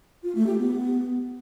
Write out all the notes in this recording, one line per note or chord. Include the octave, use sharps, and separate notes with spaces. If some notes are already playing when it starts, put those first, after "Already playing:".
F4
A3
G4
B3